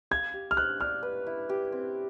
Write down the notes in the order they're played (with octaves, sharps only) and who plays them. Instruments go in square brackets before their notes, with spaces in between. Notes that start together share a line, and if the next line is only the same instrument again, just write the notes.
[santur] F5 [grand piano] G#6
[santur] G4
[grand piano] F6
[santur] C5 [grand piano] F#6
[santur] D4 [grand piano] F6
[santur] B4
E4
G4
C4